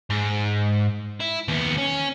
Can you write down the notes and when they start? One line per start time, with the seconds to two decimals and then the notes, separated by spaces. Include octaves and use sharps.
0.10 G#2
1.21 E4
1.48 D#2 B3
1.78 C#4